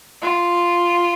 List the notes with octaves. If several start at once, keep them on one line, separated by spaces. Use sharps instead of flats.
F4